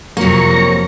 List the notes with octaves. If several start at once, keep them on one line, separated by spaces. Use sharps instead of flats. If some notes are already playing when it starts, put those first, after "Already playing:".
F2 C3 F#3 A#3 A#5 C#6